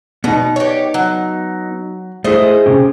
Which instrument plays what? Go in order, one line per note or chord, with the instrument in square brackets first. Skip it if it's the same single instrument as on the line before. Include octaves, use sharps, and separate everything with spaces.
[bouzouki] B2 [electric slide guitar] B3 D#4
[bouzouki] G4 C#5
F#3
[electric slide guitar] A3 E4 [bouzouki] G#4 C5 D#5
[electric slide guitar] C3 C#4 G4